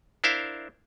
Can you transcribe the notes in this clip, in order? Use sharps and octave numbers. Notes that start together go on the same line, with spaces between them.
D4 E4 A#4 C5 E5 F5